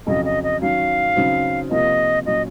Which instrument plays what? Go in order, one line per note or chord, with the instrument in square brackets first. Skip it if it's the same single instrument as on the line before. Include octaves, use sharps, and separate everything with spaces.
[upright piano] F2 C#3 F#3 [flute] D#5
[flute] D#5
D#5
[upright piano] D#3 F#3 C#4 [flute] F5
[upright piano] C#3 F#3 C4 D#4
[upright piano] C3 F3 A#3 F4 [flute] D#5
[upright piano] A#2 F#3 C#4 [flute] D#5